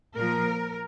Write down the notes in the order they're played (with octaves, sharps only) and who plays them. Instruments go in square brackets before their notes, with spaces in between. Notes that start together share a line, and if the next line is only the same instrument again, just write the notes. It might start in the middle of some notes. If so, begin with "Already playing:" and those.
[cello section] A#2 F3 A#4